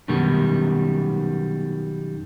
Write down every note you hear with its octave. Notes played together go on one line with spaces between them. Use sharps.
F#2 B2 D#3 G3